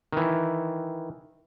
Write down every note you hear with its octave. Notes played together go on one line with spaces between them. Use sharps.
D#3 E3